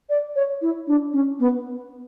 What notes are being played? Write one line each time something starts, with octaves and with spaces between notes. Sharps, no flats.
D5
C#5
E4
D4
C#4
B3